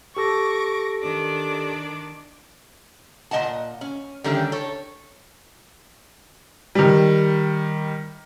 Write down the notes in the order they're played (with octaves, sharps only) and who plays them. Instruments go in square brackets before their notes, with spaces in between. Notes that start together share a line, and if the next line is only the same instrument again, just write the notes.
[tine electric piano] G4 A4 [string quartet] C#6 D6 A#6
[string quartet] D#3 D4 D6
[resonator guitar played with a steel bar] A#2 B3 D#5 F#5 A5
C#4
D3 D#3 G3 A3 C#4
A4 C#5
[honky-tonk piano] D#3 G3